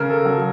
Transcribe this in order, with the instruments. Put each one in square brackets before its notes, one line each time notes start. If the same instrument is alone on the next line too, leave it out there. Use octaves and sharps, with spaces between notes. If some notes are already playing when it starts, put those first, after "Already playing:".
Already playing: [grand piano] C#3 A#4
A4
F#3